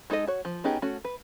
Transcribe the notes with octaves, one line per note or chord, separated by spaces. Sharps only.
G#3 D#4 A4 B4 D#5
F#4 C#5
F3
B3 C#4 D#4 G4 G#4
A3 C#4 F#4
B4